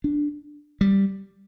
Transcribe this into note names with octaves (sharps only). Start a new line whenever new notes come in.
D4
G3